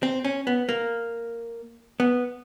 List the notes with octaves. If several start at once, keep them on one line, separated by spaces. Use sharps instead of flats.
C4
C#4
B3
A#3
B3